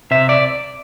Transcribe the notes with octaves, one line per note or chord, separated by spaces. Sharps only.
C3 E5
D5